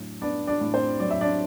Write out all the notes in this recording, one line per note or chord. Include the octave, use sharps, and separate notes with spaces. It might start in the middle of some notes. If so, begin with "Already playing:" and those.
Already playing: A2 F#3 D4
B3 D4 D5
D4 D5
A2
C4 C5
F#3 D5
E5
D4 D5